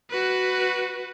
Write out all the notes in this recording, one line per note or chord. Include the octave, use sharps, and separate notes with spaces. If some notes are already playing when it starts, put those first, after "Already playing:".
F#4 B4